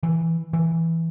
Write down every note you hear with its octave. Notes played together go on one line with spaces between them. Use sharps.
E3
E3